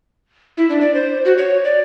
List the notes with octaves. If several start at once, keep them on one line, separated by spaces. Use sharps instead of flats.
E4
D4
D5
C5
F#4
C#5
D5